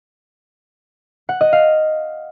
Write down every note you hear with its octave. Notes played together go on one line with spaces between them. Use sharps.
F#5
D#5
F5